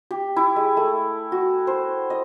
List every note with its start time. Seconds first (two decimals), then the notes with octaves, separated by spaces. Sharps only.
0.11 G4
0.36 E4
0.56 G#3
0.77 A3
1.32 F#4
1.67 C5
2.10 D#5